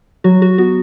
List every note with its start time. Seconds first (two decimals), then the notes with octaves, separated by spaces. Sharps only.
0.24 F#3 F#4
0.42 F#4
0.58 B3 F#4